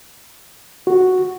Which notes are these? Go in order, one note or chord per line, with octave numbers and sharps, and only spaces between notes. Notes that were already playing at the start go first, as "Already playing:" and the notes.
F#4